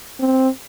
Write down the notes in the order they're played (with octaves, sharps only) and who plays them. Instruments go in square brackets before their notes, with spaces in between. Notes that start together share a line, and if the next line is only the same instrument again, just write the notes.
[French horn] C4